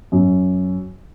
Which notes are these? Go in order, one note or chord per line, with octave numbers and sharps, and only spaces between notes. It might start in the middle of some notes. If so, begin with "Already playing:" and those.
F#2